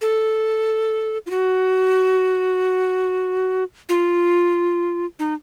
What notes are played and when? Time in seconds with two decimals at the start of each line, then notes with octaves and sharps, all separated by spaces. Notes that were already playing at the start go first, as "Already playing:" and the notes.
0.01 A4
1.26 F4
1.30 F#4
3.89 F4
5.19 D#4